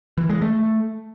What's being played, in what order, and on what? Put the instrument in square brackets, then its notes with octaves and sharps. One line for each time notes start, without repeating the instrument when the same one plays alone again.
[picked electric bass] E3
G#3
A3